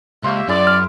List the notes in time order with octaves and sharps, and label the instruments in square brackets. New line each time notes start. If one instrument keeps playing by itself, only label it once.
[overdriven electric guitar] C#2 [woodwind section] A#3 G4 E5 [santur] C6 C#6
[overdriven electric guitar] F#2 [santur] E4 G#4 [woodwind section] D5
[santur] D6 [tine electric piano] F6